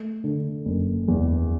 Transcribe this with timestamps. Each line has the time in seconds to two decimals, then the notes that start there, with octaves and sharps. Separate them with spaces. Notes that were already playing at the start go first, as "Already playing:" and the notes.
Already playing: A3
0.24 D3
0.65 F#1
1.08 E2